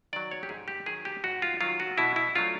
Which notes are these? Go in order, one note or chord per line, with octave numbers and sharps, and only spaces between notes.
D#3 F#3 D5
C#5
G4
G#2 G#4
G4
D#3 F#3 G#4
G4
G#2 F#4
F4
D#3 F#3 F4
F#4
B2 E4
E4
F#3 A3 D4 F4